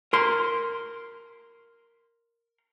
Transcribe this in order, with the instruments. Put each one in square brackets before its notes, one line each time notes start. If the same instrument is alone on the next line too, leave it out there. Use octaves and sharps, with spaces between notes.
[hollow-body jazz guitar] A#4 C6